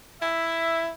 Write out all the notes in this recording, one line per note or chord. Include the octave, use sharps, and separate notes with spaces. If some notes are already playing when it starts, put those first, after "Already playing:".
E4 E5